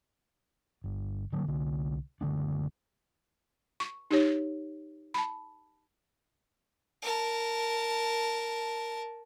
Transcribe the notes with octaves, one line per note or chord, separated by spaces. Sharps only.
G1
D3 F#3 A#3
C2 D3
F#1 D3 A3 D4
C#6
D#4 G4 C#5
A5 B5
A#4 A5